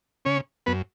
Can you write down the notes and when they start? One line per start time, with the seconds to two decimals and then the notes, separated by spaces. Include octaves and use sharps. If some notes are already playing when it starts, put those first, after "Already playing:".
0.25 C#3 C#4 C#5
0.66 F#2 B3 B4